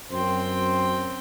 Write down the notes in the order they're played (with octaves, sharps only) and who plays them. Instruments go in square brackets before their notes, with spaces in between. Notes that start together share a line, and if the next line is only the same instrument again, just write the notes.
[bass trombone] F#2 [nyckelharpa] C4 G5 [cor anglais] C5